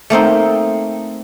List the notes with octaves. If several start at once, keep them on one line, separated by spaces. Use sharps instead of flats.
A3 A#3 C4 D#4